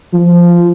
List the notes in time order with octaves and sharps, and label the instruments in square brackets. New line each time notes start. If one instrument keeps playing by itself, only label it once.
[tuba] F3